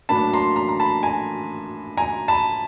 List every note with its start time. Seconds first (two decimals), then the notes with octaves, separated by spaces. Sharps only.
0.09 A2 F#3 A#3 D4 A5 B5
0.33 A#5 C6
0.56 A#5 C6
0.69 A#5
0.80 A5 B5
1.03 G#5 A#5
1.97 G#5 A#5
2.28 A5 B5